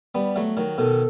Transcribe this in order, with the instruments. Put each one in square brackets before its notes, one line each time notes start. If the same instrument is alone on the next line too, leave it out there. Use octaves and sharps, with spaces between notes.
[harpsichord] G3 B3
F#3 A3
D#3 F#3
[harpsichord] B2 D#3 [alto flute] A4